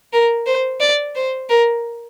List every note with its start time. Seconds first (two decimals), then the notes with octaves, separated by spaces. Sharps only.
0.13 A#4
0.47 C5
0.81 D5
1.15 C5
1.49 A#4